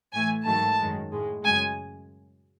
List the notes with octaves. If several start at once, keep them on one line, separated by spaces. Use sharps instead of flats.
A2 E3 A3 G#5
G#2 D#3 F#3 A3 A5
F#2 D#3 G#3
A2 G#3
F#2 C#3 G#3 G#5